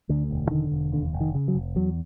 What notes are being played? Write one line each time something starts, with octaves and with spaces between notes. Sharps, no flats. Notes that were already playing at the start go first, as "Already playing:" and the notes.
D2 D3
E1
E3
D3 D#3
E1
D#2 D3
F1
D#3
C#3
F#3
F1
E2 F#3